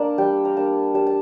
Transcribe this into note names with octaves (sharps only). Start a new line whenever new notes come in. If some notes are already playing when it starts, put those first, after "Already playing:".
Already playing: A#3 D4 D5 A5
G3 G5
A#5
A#3 D4 A5
G3 A5
A5